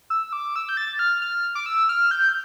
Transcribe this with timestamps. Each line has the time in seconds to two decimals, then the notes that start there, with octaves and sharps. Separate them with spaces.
0.10 E6
0.33 D6
0.56 E6
0.69 G6
0.77 A6
0.99 F6
1.22 F6
1.55 D6
1.66 E6
1.89 F6
2.11 G6